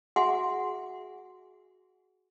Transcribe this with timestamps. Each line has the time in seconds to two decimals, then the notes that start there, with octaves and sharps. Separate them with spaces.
0.16 F#4 G#4 E5 F#5 G#5 C6